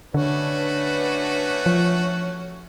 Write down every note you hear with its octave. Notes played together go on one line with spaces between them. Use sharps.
D3 A3 C#4 D4 F#4 B4
F3